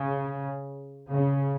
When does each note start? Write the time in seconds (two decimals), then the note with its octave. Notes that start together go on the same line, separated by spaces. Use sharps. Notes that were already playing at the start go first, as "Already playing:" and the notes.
Already playing: C#3
1.10 C#3